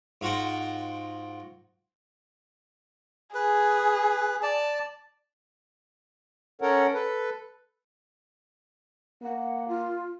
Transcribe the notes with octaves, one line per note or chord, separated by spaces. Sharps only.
G#2 F4 F#4 F#5 G5
G#4 B4
D5 A5
C#4 A4 A#4 C#5 F#5
A4 B4
A#3 F#5
F4